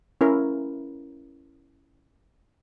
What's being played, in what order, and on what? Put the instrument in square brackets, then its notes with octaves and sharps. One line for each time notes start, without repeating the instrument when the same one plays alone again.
[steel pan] C#4 E4 A#4